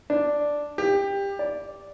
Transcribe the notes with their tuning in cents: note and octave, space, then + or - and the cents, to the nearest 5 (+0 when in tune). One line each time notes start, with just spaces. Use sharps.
D4 +0
G4 +20
D5 -5